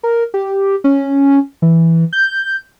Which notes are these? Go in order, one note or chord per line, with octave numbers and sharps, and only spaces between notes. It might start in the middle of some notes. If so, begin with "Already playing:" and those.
A#4
G4
C#4
E3
G6